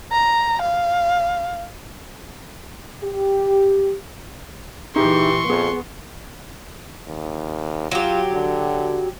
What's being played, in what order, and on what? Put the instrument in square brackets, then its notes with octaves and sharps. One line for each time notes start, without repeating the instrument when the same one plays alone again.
[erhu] A#5
F5
[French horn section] G4
[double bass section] A#2 E3 [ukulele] D#4 G#4 E5 [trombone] G4 [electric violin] C6 C#6
[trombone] F2 [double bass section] B3 [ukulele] G#4
[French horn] D#2
[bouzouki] F#3 G4 [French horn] F4
[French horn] D3